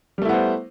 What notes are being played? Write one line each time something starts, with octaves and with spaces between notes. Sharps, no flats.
G3 A3 B3 E4 C5